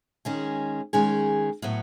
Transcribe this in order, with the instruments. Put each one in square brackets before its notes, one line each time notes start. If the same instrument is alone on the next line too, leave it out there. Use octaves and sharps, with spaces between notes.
[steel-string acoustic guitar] D#3 G#3 C#4 G#4
D#3 G#3 C#4 G#4
A2 F#3 B3